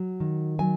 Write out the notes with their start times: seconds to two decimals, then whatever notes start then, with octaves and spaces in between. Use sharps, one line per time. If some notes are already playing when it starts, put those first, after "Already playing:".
Already playing: F#3
0.20 D#3
0.59 F#3 G#5